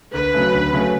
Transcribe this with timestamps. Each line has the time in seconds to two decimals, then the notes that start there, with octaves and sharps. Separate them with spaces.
0.13 D2 B4
0.33 C#3 F#3 A3 C#4
0.53 D2
0.73 C#3 F#3 A3 C#4